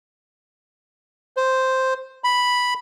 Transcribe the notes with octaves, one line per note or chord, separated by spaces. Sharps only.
C5
B5